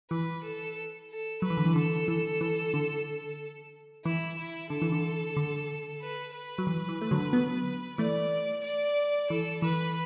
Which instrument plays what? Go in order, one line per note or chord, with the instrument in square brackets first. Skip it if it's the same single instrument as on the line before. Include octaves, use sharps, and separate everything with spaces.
[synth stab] E3 [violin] B4
[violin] A4
A4
[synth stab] F#3 [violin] B4
[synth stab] E3
D3
E3
[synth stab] D3 [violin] A4
[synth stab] E3
E3
D3
[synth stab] E3 [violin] E4
[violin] E4
[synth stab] D3 [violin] A4
[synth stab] E3
D3
D3
[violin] B4
B4
[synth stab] F#3
E3
E3
A3
D3 F#3
F#3 B3
[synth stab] E3 A3 [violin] D5
[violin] D5
[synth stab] E3 [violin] A4
[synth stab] E3 [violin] B4